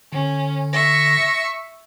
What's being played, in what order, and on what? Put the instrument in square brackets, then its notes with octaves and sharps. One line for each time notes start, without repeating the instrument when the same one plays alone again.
[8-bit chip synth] D3 [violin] C#4
[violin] E5 C#6 [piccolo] A#6